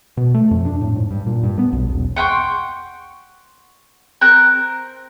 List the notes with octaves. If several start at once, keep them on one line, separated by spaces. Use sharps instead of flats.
B2
A3
F2
D4
A2
G#2
G2
A#2
G2
B3
B1
E1
F#5 G5 C6 C#6
C4 A#4 F#6 G6